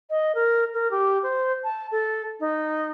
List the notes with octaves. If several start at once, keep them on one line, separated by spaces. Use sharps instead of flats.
D#5
A#4
A#4
G4
C5
A5
A4
D#4